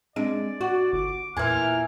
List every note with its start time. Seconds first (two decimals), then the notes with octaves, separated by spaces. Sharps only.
0.16 G#3 C4 D4 D5 D7
0.61 F#4
0.93 G1 D6
1.37 E2 A#2 E3 G#5 F6 G#6